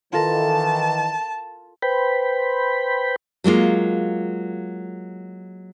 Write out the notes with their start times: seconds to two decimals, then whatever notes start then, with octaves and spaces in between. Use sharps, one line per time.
0.13 D#3 E3 F4 A4 A#4 A5
1.82 B4 C5 G5 B5
3.44 F#3 G#3 A#3 F4